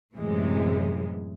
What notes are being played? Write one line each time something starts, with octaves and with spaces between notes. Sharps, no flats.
F#2 A2 C3 E3 G#3